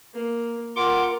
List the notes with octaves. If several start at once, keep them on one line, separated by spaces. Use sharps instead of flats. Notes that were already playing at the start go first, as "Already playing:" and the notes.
A#3
F4 A#4 F#5 C6 D6